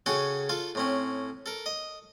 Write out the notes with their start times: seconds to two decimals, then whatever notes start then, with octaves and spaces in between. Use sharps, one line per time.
0.06 C#3 F#4 A4 G5 G#5 C#6
0.49 F4 A4 F5
0.75 A2 C4 C#4
1.46 A4 A#4
1.66 D#5